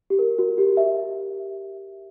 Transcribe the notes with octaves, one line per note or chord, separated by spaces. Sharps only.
G4
A#4
F#4
G4
E5